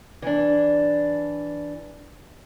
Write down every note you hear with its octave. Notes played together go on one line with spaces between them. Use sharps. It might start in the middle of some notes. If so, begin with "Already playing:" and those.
E3 D4